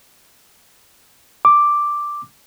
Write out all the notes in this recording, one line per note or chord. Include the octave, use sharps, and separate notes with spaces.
D6